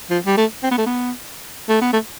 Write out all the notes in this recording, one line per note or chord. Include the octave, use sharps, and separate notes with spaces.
F3
G3
A3
C4
B3
A3
B3
A3
B3
A3